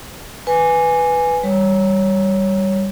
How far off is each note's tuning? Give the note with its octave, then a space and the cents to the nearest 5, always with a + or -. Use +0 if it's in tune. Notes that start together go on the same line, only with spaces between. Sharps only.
B4 +0 G#5 +0
G3 +0 C#5 +0